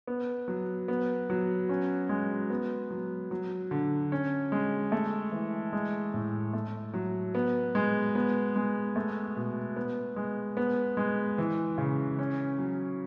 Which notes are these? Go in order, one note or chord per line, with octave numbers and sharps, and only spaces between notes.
B3
F#3
B3
F#3
C#4
G#3
B3
F#3
F#3
D3
C#4
G#3
A3
E3
G#3
A2
A3
F#3
B3
G#3
B3
G#3
A3
B2
B3
G#3
B3
G#3
E3
C#3
C#4
F#3